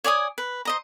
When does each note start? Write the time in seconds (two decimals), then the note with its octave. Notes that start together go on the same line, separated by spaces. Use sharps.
0.04 C#5 D5 G#5 D#6
0.38 B4
0.65 C5 D#5 A#5